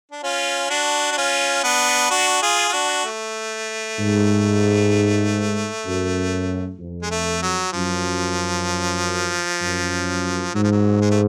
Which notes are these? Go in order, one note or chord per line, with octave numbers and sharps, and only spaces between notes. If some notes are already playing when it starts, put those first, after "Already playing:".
D4
C#4 F4
D4 F#4
D4
C#4 F4
B3 D4
D4 F#4
F4 G#4
F4
D4 F#4
A3
G#2
F#2
F2
G#3
A3
F#3
F#2 F3
F#2
G#2 F#3
F3
F#3
G#3
A3